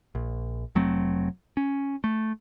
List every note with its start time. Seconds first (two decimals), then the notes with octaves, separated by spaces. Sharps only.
0.15 A#1
0.75 F1 F#3 A3 C4
1.57 C#4
2.04 A3